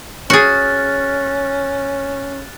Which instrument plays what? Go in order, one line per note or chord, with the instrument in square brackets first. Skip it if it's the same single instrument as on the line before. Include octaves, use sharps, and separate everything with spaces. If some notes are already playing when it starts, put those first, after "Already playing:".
[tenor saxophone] C#4 [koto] F#4 G#4 [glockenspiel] F6 F#6 A6